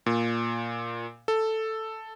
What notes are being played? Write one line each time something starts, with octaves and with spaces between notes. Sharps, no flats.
A#2
A4